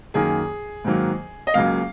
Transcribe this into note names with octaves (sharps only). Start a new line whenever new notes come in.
F#2 D#3 A#3 G#4
G#2 D#3 F#3 A#3
D#5
C#2 C#3 F#3 A#3 F5